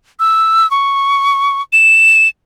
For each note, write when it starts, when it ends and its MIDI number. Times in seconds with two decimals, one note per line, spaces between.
0.20 0.69 88
0.71 1.62 85
1.73 2.28 100